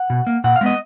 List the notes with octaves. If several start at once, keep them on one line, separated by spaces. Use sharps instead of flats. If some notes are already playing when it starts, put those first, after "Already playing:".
Already playing: F#5
B2
A#3
A#2 F#5
F5
G#3 B3 D#5